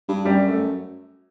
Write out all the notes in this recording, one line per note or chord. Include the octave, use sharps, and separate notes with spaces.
G2
F#2 G3
A3